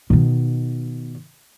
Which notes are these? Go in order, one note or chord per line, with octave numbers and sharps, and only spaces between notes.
B2 D#3